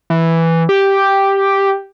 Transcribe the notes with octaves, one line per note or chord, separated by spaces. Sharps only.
E3
G4